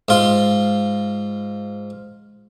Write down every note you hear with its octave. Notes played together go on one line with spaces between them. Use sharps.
G#2 F4